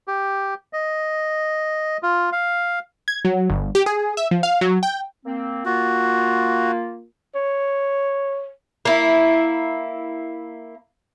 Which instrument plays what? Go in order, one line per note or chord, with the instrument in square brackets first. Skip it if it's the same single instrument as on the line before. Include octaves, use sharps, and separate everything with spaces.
[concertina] G4
D#5
F4
F5
[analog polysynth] G#6
F#3
G1
G4
G#4
E5
F3
F5
F#3
G5
[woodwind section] A#3 C4
[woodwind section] A#3 F4 [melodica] F#4
[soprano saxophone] C#5
[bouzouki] A#3 E4